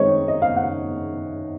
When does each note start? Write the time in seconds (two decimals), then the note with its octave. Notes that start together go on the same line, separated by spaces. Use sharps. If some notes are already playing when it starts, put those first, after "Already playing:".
Already playing: D#3 G#3 C4 D#4 C#5 D#5
0.28 D#5
0.42 F5
0.56 F#5